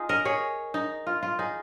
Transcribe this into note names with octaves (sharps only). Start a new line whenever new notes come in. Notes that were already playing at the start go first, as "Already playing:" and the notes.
Already playing: D#4 F4 G#4
A#4 D#5
G#4 C#5
D#4
F4
F4
D#4 G#4